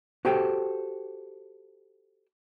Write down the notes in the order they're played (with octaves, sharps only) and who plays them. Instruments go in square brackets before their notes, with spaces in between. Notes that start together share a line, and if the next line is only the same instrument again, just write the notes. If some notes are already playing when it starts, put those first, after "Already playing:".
[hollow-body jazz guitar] F#4 G4 A4 C5 G5